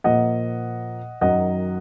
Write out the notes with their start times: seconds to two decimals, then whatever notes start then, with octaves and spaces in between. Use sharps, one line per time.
0.04 A#2 F3 A#3 D#5 F#5
1.21 F#2 D#3 F#3 D#5 F#5